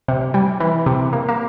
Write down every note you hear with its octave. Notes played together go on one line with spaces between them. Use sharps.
C3
G3
E3
C3
A#3
A#3